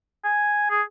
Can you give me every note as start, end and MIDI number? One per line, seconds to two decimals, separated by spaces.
0.24 0.66 80
0.70 0.82 68